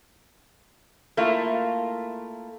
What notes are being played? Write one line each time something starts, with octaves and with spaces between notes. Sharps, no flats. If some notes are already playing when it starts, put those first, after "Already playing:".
A3 A#3 E4 F4